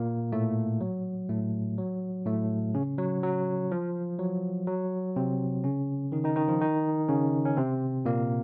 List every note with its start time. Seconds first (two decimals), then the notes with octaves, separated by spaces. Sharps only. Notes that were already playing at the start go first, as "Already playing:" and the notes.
Already playing: A#2 A#3
0.32 A2 A3
0.81 F#3
1.29 A2 A3
1.78 F#3
2.26 A2 A3
2.74 C#3 C#4
2.98 F#3
3.23 F#3
3.72 F3
4.19 F#3
4.67 F#3
5.16 C3 C4
5.64 C#3 C#4
6.12 D#3 D#4
6.24 D#3 D#4
6.36 D#3 D#4
6.48 F3 F4
6.60 D#3 D#4
7.09 C#3 C#4
7.45 C#4
7.57 C3 C4
8.05 A#2 A#3